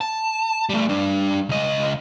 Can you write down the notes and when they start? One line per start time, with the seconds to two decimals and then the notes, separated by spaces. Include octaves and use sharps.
0.01 A5
0.69 G3 A3
0.89 G3 D4
1.49 C#2 D#5